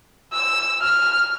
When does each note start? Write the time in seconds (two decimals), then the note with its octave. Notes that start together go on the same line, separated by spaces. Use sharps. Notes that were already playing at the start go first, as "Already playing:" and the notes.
0.33 E6
0.82 F6